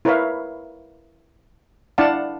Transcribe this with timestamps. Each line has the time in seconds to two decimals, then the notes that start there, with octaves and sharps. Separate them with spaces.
0.05 E4 A#4 B4 C#5 E5 F5
1.98 D4 E4 D5 F5 F#5 A5